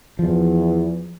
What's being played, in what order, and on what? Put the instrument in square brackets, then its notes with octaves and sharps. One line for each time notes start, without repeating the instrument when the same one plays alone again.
[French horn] E2 [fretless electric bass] F3